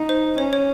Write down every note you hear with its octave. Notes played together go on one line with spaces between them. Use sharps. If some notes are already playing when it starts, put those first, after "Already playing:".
Already playing: D#4
C5
C#4 C#5
C#5